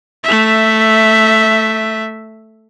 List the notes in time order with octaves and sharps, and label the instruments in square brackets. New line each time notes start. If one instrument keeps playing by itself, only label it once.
[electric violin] A3 E5